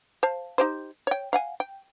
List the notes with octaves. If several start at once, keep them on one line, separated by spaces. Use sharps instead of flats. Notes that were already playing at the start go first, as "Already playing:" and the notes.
C5 F5 A5
D#4 G4 C5
C#5 G5
F5 F#5 G#5
G5